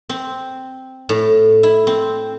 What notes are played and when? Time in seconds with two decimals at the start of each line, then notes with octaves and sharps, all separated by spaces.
0.09 C4
1.09 A2
1.63 E4
1.87 C4